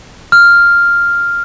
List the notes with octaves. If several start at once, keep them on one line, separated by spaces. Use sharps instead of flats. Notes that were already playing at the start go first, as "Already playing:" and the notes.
F6